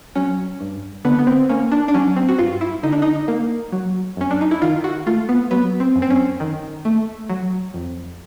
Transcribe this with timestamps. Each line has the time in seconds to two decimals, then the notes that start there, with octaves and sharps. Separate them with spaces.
0.15 F#3 C#4
0.60 G2
1.05 D3 B3
1.19 B3
1.27 C4
1.49 A#3 C#4
1.72 D4
1.88 D4
1.94 F#3 C#4
2.17 C4
2.28 F#4
2.38 G2 F4
2.61 E4
2.83 D3 D#4
2.92 D4
3.02 D#4
3.28 A#3
3.72 F#3
4.17 F#2 C#4
4.31 D4
4.41 D#4
4.51 E4
4.62 D#3 F4
4.84 F#4
5.06 A3 F4
5.29 B3
5.51 F#3 B3
5.80 C4
5.96 F#2
6.02 C4
6.10 C#4
6.40 D#3
6.85 A3
7.30 F#3
7.74 F2